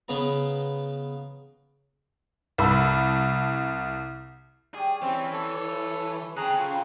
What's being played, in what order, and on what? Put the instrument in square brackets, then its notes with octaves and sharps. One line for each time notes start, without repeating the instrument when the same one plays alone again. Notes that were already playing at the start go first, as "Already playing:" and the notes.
[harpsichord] C#3 B3 A#5
[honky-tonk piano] C2 A5 B5 E6
[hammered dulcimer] G3 C#5 D5 [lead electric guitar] G#4
[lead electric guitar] E3 [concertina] C4 C#4 [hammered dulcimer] C5
[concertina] A4 C#5
[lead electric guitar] C#3 [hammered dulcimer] C4 A4 C#5 [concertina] G#4 A#5 F#6
[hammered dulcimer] F#3 C4 [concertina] F4